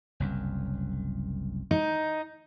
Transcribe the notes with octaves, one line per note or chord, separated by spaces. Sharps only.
F#1 C2 F#2
D#4